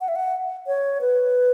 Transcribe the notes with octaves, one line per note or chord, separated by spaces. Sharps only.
F#5
E5
F#5
C#5
B4